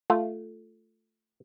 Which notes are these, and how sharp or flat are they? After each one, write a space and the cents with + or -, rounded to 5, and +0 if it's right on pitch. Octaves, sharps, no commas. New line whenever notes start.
A3 +0 F4 +0